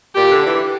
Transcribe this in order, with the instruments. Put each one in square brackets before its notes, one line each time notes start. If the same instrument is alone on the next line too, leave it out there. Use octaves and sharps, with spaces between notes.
[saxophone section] A#2 [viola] G4
[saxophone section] D3
E3